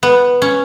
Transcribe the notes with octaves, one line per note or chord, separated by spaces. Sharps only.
B3
C#4